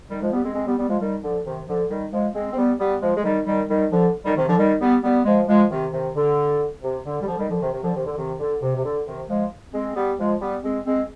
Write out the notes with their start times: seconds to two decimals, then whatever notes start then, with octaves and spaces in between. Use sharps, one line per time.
0.10 D#3 G3
0.21 F3 G#3
0.32 G3 B3
0.44 G#3 C4
0.55 G#3 C4
0.66 G3 B3
0.78 G3 B3
0.88 F3 G#3
0.99 D#3 G3
1.22 D3 F3
1.45 C3 D#3
1.67 D3 F3
1.89 D#3 G3
2.12 F3 G#3
2.34 G#3 C4
2.52 C4
2.57 G3 B3
2.79 G3 B3
3.01 F3 G#3
3.16 G#3
3.24 D#3 G3
3.46 D#3 G3
3.68 D#3 G3
3.91 D3 F3
4.25 D#3 G3
4.36 C3 D#3
4.47 D3 F3
4.58 D#3 G3
4.80 G3 B3
5.03 G3 B3
5.25 F3 G#3
5.47 F3 G#3
5.70 C3 D#3
5.93 C3 D#3
6.15 D3
6.82 C3
7.05 D3
7.21 G3
7.27 D3 F3
7.38 D#3 G3
7.50 D3 F3
7.61 C3 D#3
7.71 C3 D#3
7.83 D3 F3
7.95 C3 D#3
8.06 D3
8.17 C3 D#3
8.40 D3
8.62 C3
8.76 C3
8.84 D3
9.06 C3 D#3
9.29 F3 G#3
9.73 G#3 C4
9.96 G3 B3
10.18 F3 G#3
10.41 G3 B3
10.63 G#3 C4
10.86 G#3 C4